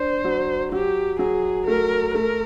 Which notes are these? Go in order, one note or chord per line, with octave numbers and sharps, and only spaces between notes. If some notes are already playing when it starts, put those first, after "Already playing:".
Already playing: D4 C5
F#3
F#3 G4
F#3 G#4
A3 A#4
A3 A#4